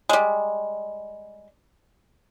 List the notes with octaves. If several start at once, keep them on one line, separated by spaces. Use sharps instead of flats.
G3 G#3